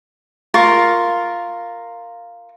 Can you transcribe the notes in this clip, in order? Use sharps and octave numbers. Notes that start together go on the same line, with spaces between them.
F4 A#4 C#6